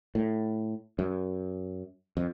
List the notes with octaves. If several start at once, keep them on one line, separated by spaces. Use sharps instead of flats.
A2
F#2
F2